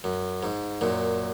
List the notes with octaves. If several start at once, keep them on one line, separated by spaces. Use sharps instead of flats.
F#2
G#2
F#2 A#2